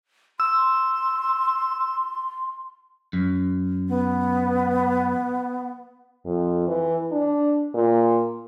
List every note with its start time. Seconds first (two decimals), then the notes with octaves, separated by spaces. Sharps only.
0.40 C6 E6
3.13 F#2
3.88 B3
6.25 F2
6.68 E3
7.12 D4
7.74 A#2